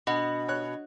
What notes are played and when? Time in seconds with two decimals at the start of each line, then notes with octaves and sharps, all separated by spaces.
0.07 B2 D4 D#5 F#5
0.48 C#5 F#6